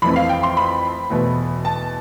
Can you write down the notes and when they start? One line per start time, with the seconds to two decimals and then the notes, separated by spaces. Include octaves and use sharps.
0.02 F2 E3 A3 C4 B5
0.16 F5
0.29 G5
0.43 C6
0.57 B5
1.10 E2 B2 A3
1.65 A5